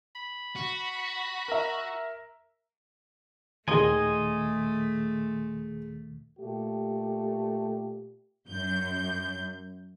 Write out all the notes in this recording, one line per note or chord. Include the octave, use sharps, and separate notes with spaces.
B5
F#4
A#4 E5
D#2 A#2 D#3 A3 G#4 D#5 G#5 C6
A#2 A3 G4
F#2 G6